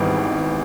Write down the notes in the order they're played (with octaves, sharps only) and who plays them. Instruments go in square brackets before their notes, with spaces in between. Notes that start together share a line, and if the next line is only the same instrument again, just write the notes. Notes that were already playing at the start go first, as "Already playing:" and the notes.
Already playing: [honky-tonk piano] G#1 G#2 E3 G3 B3